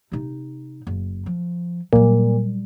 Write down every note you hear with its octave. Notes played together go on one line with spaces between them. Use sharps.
C3 D#4
F#1
F3
A#2 F#3 G3